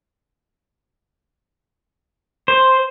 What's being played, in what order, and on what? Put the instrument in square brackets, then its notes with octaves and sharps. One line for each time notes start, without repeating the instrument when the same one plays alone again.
[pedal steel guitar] C5